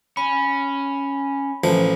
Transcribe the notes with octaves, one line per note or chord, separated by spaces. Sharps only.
C#4 B5
A1 F3